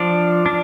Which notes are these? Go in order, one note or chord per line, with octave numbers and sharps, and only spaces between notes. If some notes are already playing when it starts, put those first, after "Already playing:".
Already playing: F3 D4
D4